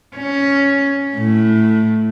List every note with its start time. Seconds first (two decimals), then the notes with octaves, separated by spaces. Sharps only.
0.17 C#4
1.16 A2